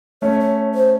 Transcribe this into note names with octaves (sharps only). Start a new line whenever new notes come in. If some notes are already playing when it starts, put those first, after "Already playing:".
A3 C#4 C#5
C#5
C5